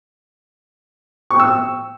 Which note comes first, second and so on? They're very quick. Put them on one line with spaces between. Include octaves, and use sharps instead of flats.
C#6 G5 E6